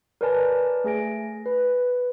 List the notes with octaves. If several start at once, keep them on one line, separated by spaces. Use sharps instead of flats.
A#4 B4 C#5 D5 G#5 A5
A3 G#4 G#5 A#6 D7
B4